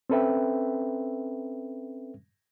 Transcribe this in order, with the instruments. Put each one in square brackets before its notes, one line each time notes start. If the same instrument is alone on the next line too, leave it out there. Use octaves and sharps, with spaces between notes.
[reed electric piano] C4 C#4 A4 B4 E5 G5